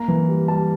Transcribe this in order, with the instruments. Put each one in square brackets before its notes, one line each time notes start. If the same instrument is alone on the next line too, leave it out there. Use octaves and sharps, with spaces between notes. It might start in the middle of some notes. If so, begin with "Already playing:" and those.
Already playing: [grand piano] A#3 A#5
E3
G3
G3 A5